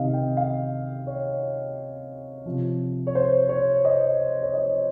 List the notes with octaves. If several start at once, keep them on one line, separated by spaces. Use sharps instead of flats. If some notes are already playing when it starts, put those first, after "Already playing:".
Already playing: C3 D#3 D#5 F5
G5
F5
C#5
C3 F3
C#5
C5
C#5
D#5
C#5
D#5